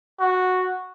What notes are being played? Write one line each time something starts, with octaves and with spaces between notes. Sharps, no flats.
F#4